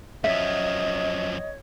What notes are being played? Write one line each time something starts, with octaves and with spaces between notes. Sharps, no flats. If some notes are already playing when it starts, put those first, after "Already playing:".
F#2 F3 C#5 D#5 E5